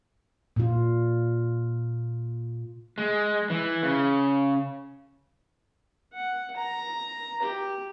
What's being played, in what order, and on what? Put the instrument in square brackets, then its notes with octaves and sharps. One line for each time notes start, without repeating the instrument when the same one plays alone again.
[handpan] A#2 F4
[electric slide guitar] G#3
E3
C#3
[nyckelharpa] F#5
A#5
G4